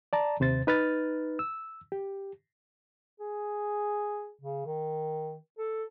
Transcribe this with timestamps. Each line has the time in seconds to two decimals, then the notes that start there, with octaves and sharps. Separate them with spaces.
0.13 D5 A5 A#5
0.40 D#2 C3 C5 A6
0.67 D#4 B4 F6 A6
1.39 E6
1.92 G4
3.20 G#4
4.41 C#3
4.66 D#3
5.58 A4